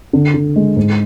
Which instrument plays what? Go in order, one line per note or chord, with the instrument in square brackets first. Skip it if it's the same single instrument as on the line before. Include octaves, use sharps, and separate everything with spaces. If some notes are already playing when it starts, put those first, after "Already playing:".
[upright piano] D3
D3
G#3
G#2